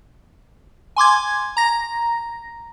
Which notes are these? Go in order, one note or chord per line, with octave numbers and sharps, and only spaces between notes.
G#5 C6 D6 G#6
A#5 A#6